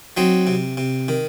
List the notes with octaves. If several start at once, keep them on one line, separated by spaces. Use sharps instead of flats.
F#3 C4 D#4
C3
C3
D#3